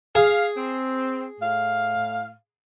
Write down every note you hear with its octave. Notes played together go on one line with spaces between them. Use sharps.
G#4 F5
C4
A2 F5